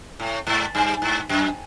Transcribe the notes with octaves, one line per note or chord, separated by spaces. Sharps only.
A2
G#2
G2
G#2
F#2